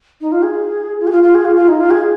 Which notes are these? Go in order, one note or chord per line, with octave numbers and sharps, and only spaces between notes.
D#4
F4
G#4
F4
G#4
F4
F4
G#4
F4
F4
D#4
F4
G#4